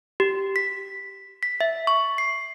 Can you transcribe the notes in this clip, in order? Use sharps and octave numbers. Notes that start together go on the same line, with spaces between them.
G4
B6
B6
E5
C#6
C7